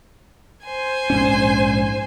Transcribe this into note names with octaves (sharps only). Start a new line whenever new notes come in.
C5 G#5
A#1 G#2 C#4